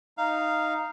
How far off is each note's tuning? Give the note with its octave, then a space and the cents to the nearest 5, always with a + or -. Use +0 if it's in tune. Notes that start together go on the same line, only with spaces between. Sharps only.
D#4 +0 F5 -10